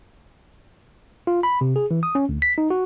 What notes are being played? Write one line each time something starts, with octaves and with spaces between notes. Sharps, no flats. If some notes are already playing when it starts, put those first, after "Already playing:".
F4
B5
C3
G#4
E3
D#6
C#4
D2
B6
D#4
F#4